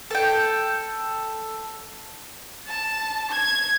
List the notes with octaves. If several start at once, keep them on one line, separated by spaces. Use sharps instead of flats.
A4 G5
A5
G#6